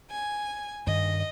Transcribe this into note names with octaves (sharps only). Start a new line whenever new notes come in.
G#5
G2 D#3 D#5